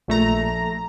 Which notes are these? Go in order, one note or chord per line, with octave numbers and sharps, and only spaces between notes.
A#1 A3 A#5